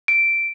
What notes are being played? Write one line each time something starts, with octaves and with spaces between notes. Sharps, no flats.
D7